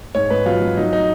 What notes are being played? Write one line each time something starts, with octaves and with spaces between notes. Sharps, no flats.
G#2 C#5
G#2 B4
F#3 F4
F#3
F#3 D#4
D#4